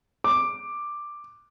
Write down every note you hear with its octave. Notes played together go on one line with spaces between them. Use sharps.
D6